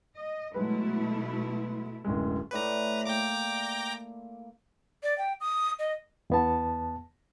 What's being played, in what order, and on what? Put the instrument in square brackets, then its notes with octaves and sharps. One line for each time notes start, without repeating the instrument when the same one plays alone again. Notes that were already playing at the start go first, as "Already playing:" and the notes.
[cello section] D#5
[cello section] B2 A3 E4 [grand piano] F#3 G#3 B4
[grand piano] D1 F#2 G#3
[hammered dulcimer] A2 D5 C6 [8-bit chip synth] B4 A#5
[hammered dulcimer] A#3 [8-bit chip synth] G5 A#5 D6
[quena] D5
G5
D#6
D#5
[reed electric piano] E2 B3 A5